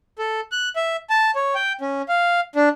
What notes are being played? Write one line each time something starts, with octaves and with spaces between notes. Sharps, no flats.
A4
F#6
E5
A5
C#5
G5
C#4
F5
D4